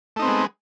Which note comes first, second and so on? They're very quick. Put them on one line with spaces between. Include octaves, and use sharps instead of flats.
A3 D#4 C4 B3 G#3